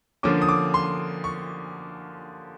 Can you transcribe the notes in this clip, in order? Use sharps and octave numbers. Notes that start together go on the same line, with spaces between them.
D3 F3 A#3 C#4 D6
D#6
D6
C6
C#6